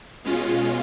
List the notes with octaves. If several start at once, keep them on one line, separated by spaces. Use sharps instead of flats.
B2 G#3 C#4 F4